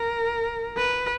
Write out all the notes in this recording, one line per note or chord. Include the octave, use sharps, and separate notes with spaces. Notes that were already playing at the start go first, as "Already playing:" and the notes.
Already playing: A#4
B4